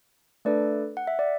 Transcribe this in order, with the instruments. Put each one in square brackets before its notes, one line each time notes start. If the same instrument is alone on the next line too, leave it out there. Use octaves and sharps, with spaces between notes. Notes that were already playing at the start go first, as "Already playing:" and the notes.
[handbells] A3 D4 A4 B4 D5
F#5
E5
D5